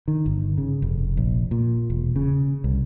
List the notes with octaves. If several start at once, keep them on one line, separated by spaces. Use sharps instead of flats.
D#3
G1
C#3
F1
A#1
A#2
E1
C#3
C2